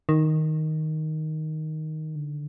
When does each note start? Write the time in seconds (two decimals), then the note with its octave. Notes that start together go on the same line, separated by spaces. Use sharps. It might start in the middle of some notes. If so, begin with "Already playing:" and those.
0.09 D#3
2.15 D3